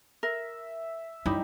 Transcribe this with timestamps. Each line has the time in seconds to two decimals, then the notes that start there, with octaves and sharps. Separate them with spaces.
0.23 A#4 E5
1.26 F#2 G3 D#4 E4